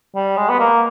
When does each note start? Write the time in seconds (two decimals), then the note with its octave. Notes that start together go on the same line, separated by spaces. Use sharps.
0.15 G3
0.37 G#3
0.49 B3
0.59 A#3